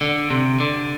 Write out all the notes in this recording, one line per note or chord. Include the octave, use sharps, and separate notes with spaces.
D3
C3
D3